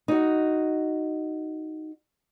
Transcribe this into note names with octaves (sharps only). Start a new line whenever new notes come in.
D#4 F#4